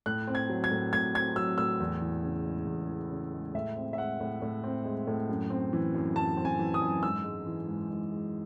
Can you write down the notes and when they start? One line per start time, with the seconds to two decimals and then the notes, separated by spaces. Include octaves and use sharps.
0.06 A2 F#6
0.27 C4
0.35 G#6
0.49 F#3
0.64 G#6
0.71 A2
0.93 A2 G#6
1.15 C4 G#6
1.36 F#3 E6
1.58 A2 E6
1.80 E2
2.02 E3
2.23 C#3
2.45 G#3
2.67 E2
2.89 E3
3.11 C#3
3.33 G#3
3.55 A2 E5
3.76 C4
3.93 E5
3.97 G#3 F#5
4.20 A2
4.42 A2
4.64 C4
4.85 G#3
5.07 A2
5.29 F#2
5.50 C4
5.73 E3
5.95 F#2
6.16 F#2 A5
6.37 C4
6.45 G#5
6.59 E3
6.74 D#6
6.82 F#2
7.03 G#2 E6
7.24 G#3
7.46 E3
7.68 G#2
7.90 G#2
8.11 G#3